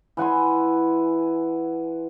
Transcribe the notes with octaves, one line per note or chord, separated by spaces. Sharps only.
E3 F#5 G#5 C6